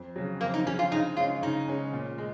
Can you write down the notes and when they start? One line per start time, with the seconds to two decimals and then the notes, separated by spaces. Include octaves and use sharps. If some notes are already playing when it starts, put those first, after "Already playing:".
Already playing: F2
0.16 C#3 F#3
0.41 F2 A#3
0.54 D#4
0.66 C#3 F#3 C#4
0.79 F4
0.92 C#3 D#4
1.17 G#3 C#4 F4
1.42 C#3 D#4
1.68 G#3 C#4
1.93 A#2
2.18 G#3